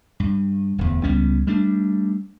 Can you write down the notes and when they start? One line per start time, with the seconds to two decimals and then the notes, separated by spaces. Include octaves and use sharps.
0.20 G2
0.78 D1 E2
1.03 C#2 G3 B3 C#4
1.47 G3 A3 D4